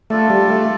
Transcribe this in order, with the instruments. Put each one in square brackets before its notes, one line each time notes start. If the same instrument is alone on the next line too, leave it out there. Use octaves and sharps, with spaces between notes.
[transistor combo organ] A3 [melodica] D4 F4 A4 D5
[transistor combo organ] G3
A3